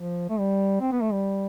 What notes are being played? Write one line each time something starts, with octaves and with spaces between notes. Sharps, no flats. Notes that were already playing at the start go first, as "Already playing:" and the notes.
Already playing: F3
A3
G3
C4
B3
A3
G3